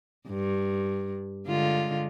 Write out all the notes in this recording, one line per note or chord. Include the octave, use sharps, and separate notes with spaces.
G2
D3 G#3 F4